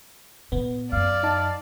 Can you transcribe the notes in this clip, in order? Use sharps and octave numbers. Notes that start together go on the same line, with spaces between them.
A#2 B3
F#2 D5 F5
D#4 A5